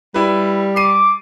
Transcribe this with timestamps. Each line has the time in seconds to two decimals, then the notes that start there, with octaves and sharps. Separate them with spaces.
0.14 G3 E4 B4
0.76 D6 C7 D#7